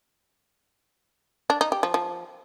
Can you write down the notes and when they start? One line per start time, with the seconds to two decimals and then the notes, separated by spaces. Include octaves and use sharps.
1.50 D4
1.61 D#4
1.72 G4
1.83 F3
1.94 F3